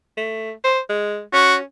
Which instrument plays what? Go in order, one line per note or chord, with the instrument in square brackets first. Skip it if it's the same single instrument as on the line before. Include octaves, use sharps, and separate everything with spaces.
[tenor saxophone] A3
C5
G#3
[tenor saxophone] C#4 [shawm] F#4